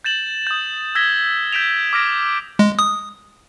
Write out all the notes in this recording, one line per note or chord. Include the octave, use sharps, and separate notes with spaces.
G6 A6 E7 F#7
D#6 G6
E6 G#6 A#6 B6 G7
G6 B6 D7 E7 F7
D6 E6 F6 G#6 A#6 D7
G#3
D#6